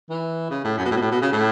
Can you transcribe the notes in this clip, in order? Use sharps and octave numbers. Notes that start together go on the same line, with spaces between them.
E3
C#3
A2
F#2
B2
A2
B2
A2
B2
C#3
A2